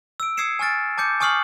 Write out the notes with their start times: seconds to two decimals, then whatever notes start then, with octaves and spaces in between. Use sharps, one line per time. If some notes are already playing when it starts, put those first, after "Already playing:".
0.20 E6 D7
0.37 D#6 E6 G#6 C7 C#7 E7
0.59 G#5 C#6 F6 A6 D7
0.98 A5 D6 G6 C#7
1.20 G#5 C#6 D#6 F6 C7 F#7